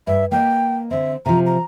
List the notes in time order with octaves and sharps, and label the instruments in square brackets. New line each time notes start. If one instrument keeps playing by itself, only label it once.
[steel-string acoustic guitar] G2 [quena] E5
[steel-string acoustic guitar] A#3 D#5 [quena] G5
[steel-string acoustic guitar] D3 C4 [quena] E5
[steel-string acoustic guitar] C3 F3 [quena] A#5
[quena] A#5